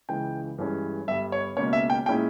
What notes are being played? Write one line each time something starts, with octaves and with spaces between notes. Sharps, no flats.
C#2 C#3 E3 G5
G2 E3 G#3 C#4
G1 G2 G3 E5
C#5
C#2 B2 A#3 C#4 C#5
E5
G5
A#2 G#3 C#4 E4 G5